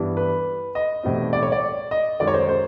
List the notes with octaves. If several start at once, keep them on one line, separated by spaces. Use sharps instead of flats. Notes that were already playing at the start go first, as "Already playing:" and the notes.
Already playing: G2 E3 G3 B3
B4
D#5
B1 A2 E3 G3 C4
D5
C#5
D5
D#5
F#2 D#3 G#3 D5
C#5
C5
C5